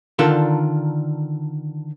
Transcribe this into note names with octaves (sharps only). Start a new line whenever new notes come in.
D3 D#3 D4 F4 A4 A#4